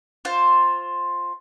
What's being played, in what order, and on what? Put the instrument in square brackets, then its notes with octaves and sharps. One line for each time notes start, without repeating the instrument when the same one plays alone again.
[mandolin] F4 C5